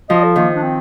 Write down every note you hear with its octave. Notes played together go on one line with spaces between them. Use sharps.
F3 D#5
A4
D#3 A#3
D4
C4